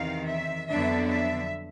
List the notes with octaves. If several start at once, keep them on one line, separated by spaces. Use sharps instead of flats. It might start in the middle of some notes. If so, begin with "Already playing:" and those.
Already playing: E2 C3 D#3 F5
E5
F2 D3 F#3 B3 D4 E5
E5